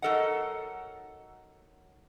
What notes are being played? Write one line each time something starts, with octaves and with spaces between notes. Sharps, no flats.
F#3 D#4 A4 A#4 D#5 F#5